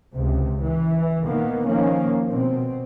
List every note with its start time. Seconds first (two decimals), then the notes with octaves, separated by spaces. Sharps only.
0.13 C#2 C3
0.61 E3
1.26 A#2 D#3 A#3 B3
1.67 D#3 F3 A#3 C#4
2.30 B2 C4